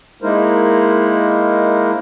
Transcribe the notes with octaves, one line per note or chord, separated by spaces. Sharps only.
G#3 A#3 D#4 E4 A#4 C5